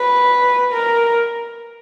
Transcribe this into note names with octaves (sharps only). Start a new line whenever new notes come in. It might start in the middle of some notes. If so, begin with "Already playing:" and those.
Already playing: B4
A#4